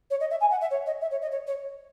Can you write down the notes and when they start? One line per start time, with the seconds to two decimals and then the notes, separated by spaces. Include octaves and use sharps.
0.11 C#5
0.20 D#5
0.31 E5
0.41 G#5
0.51 F#5
0.61 E5
0.71 C#5
0.86 D#5
1.01 E5
1.11 C#5
1.22 D#5
1.32 C#5
1.47 C#5